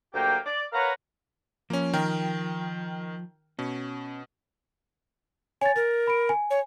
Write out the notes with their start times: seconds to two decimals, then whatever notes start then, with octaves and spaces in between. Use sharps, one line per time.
0.14 D2 F#3 A#3 G4 G5
0.45 D5
0.72 A#4 B4 C#5 F5 F#5 A#5
1.70 F3 A#3 C#4
1.93 D#3 A#4 G5
3.59 B2 C#4
5.61 C#5 G#5 A6
5.76 A#4 A6
6.07 B5 D7
6.29 G#5
6.50 C#5